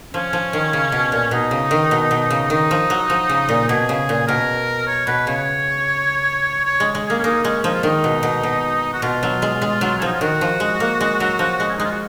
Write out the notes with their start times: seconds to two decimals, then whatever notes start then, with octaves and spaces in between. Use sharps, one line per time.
0.13 F3 C#4
0.33 F3
0.53 D#3
0.73 C#3
0.92 B2
1.12 A#2
1.31 B2 D#4
1.51 C#3
1.71 D#3
1.91 B2
2.11 B2
2.30 C#3
2.50 D#3 D#4
2.71 F3
2.90 F#3
3.10 F3
3.29 C#3
3.49 A#2
3.68 B2 G#4
3.89 C#3
4.09 A#2
4.28 B2 A#4
4.87 C#5
5.07 B2 B4
5.27 C#3 C#5
6.65 C#5
6.80 G#3
6.95 G#3
7.05 A#3 G#4
7.19 C#4
7.24 A#3 D#4
7.44 G#3 C#4
7.64 F3 D#4
7.74 F4
7.83 D#3 D#4
8.04 B2
8.23 B2
8.43 B2
8.94 F#4
9.02 B2 F4
9.23 F#3
9.42 G#3
9.62 G#3
9.81 F#3
9.98 C#4
10.02 F3 D#4
10.13 F4
10.21 D#3 F#4
10.41 F3
10.60 G#3
10.80 A#3
11.01 G#3
11.20 F#3
11.39 F3
11.60 G#3
11.69 C#4
11.77 D#4
11.80 G#3 F4
11.91 F#4